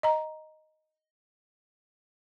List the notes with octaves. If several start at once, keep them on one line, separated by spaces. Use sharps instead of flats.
D#5 A#5